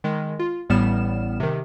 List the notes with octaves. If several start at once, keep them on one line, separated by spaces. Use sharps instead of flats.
D#3 G#3
F4
A1 A2 G3 B3 F6 E7
C3 D#3